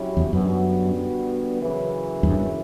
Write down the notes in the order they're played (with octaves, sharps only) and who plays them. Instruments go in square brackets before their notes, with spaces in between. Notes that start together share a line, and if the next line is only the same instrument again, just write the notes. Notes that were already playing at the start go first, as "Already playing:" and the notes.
Already playing: [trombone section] F#3 C#4 E4 G4
[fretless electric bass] E2
[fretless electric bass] F#2 [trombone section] D3 G3 B3 F#4
[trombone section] F#2 C#3 E3
[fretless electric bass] E2 G2